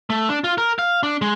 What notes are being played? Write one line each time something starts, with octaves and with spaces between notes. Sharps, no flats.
A3
D4
F4
A#4
F5
D4
G#3